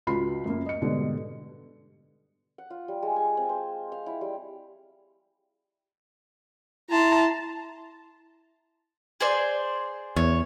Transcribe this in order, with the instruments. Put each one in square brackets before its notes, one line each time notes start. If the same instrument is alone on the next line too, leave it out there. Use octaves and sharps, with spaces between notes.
[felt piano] C#2 F4 F#4 B5 C7
F#2 A#3
D#5 C#7
G#2 B2 D3 G3
[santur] F#5
F4
G3
G#3
G#5
C4
C5
F5
E4
G3
[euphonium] E4 [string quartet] A5 A#5 C6
[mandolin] G#4 C5 D5
[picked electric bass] E2 [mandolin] C#5